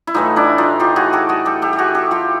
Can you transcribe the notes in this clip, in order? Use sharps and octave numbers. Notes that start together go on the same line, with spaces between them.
E4
A2 E3 A3 D#4 F4
D4 E4
D#4 F4
F4 G4
F#4 G#4
G4 A4
F#4 G#4
G4 A4
G4 A4
G4
F#4 G#4
G4 A4
F4 G4